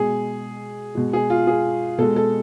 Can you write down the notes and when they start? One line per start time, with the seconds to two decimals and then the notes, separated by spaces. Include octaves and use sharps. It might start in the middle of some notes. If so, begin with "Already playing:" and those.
Already playing: B2 G#3 G#4
0.95 B2 G#3
1.13 G#4
1.30 F4
1.47 G#4
1.98 B2 G#3 A4
2.16 A4